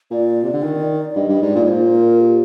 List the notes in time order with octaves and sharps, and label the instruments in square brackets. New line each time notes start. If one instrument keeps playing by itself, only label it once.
[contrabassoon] A#2 [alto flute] D5
[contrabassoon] C3
D3
D#3
[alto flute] D5
[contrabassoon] G2 [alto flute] D#5
[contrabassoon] G2
[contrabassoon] G#2 [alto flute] D5
[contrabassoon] A#2
G#2
[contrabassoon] A#2 [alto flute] C5
[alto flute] A#4
G4